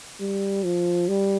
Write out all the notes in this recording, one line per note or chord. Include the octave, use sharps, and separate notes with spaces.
G3
F3
G3